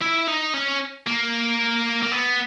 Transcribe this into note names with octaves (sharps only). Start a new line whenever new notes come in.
E4
D#4
C#4
A#3
A#3
B3